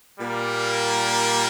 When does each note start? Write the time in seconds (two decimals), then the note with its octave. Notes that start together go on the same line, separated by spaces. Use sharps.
0.17 A#2 G3 A#3